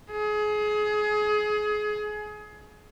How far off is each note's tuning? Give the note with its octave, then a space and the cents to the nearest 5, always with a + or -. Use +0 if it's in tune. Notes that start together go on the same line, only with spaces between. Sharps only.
G#4 +25